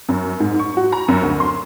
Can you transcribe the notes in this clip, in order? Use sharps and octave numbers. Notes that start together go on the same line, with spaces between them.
F#2
G#2
C#6
F#4
A#5
F#2
D2
C6